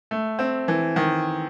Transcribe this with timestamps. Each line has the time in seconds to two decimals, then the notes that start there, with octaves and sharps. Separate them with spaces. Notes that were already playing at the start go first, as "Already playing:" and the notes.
0.11 A3
0.39 C4
0.68 E3
0.96 D#3